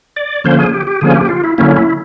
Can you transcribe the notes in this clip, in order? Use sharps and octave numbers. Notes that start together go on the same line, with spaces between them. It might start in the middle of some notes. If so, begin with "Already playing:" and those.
D5
D3 F3 A#3 C#4 C5
G#4
G4
G4
D3 F3 A#3 C#4 G#4
G4
F4
E4
D3 F#3 A#3 C#4 E4
E4